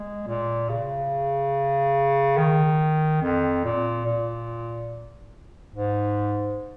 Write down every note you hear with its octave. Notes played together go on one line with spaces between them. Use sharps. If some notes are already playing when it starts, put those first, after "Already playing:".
Already playing: G#3
A#2
C#3
D#3
F2
A#2
A#2
G#2